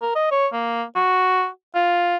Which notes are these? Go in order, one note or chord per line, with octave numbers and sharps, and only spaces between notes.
A#4
D#5
C#5
A#3
F#4
F4